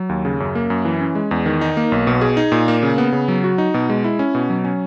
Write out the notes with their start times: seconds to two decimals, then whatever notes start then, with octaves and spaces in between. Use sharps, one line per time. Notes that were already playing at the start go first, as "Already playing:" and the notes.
Already playing: F#3
0.09 D#2
0.25 C#3
0.40 F#2
0.55 A#3
0.70 F#2
0.85 E3
1.01 C#4
1.15 G#3
1.31 E2
1.46 D#3
1.61 D#4
1.77 A#3
1.92 B1
2.07 B2
2.21 G#4
2.37 D#4
2.52 A#2
2.68 A#3
2.83 C#3
2.98 B3
3.12 C#3
3.28 F#3
3.44 F#4
3.58 D#4
3.74 B2
3.89 G#3
4.04 E4
4.19 C#4
4.35 B2
4.50 F#3
4.64 C#4